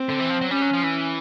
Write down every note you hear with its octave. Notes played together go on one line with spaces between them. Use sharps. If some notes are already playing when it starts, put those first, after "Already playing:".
Already playing: C4
D3
E3
F3
F#3
G3 C#4
F#3
F3
E3